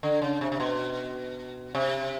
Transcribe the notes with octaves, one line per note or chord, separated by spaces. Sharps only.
D3
C#3
C3
C3
B2
C3